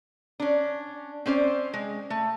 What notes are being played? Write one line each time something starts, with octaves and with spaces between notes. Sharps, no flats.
C#4 D4
C4 C#4 C5 D5
G#3
A3